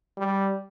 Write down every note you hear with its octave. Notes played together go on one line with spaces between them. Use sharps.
G3